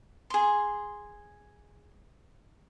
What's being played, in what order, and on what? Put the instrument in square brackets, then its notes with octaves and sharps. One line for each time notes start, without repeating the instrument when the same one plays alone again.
[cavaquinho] G#4 C6